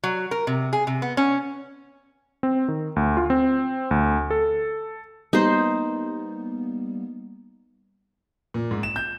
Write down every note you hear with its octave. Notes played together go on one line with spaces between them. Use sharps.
F#3
A#4
C3
G#4
C3
B3
C#4
C4
D#3
D2
F4
C4
D2
A4
G3 A#3 B3 D#4 C5
A#2
G#2
E7
G6